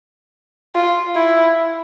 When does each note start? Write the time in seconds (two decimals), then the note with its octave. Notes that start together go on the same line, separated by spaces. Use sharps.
0.75 F4
1.16 E4